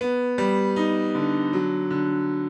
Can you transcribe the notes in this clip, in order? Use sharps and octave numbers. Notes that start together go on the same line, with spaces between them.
B3
G3
D#4
D3
F#3
D3